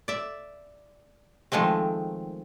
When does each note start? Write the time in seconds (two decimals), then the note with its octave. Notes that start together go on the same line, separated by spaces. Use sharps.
0.08 D5 E5
1.52 D#3 F3 G#3 A3 C4